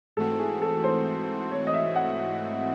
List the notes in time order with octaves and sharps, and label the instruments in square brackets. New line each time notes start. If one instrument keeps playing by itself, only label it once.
[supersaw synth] G#2 E3 A3 C4 F#4 [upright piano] A4
[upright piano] G#4
A4
C5
C#5
D#5
E5
F#5